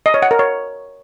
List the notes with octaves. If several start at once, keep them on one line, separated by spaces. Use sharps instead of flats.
D#5
C#5
F#5
A#4
C#5